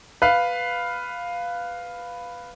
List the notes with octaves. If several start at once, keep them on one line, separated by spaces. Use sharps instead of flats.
B4 F5